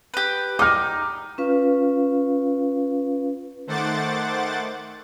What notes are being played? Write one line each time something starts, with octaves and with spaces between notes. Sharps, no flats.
G4 B4
D#4 D6 F6
C#4 F4 B4 F5
D#3 A3 C5 F#5 D6 A6